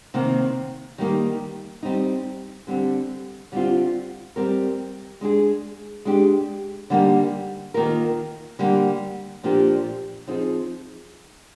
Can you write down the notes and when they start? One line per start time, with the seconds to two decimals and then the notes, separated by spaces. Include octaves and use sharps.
0.14 C3 D#3 A#3
0.98 D#3 G3 A#3 D#4
1.83 G3 C4 D#4
2.67 D3 G3 C4
3.52 D3 G3 C4 F4
4.36 G3 C4 G4 A#4
5.21 G#3 D4 G#4
6.05 G#3 D4 G4
6.90 D3 G3 A#3 D#4
7.74 D#3 A#3 F4 A#4
8.59 D3 G3 A#3 D4
9.43 A#2 F3 A#3 D4 G4
10.28 F3 C4 D#4 G#4